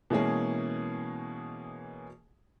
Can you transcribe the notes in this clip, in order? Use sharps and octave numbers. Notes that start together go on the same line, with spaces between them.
B2 E3 G#3 A#3 C#4 G#4